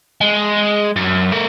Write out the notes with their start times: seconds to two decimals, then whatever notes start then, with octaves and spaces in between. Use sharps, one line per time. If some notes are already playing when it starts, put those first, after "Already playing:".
0.21 G#3
0.96 F#2
1.32 A3 A#4